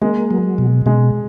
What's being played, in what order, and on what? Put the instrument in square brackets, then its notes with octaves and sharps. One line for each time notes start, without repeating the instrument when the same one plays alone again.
[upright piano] G#3 [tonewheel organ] A#3
[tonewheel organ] F#3
B2
[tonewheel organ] B2 [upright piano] G#3